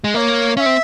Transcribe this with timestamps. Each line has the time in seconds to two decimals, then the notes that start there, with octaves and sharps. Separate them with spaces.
0.04 G#3
0.14 A#3 C#5 E5
0.57 C#4 F5
0.60 E5
0.66 C4